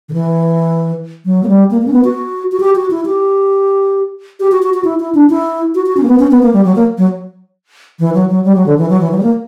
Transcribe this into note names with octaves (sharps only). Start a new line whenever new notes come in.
D3
E3
F#3
A#3
G3
A#3
A#3
C#4
B3
F#4
F#4
G4
F#4
E4
G4
G4
F#4
F#4
F#4
E4
E4
D4
E4
F#4
F#4
C#4
A#3
B3
C#4
B3
A#3
G3
F#3
A#3
F#3
E3
F#3
F#3
G3
F#3
D3
E3
F#3
E3
F#3
G3
A#3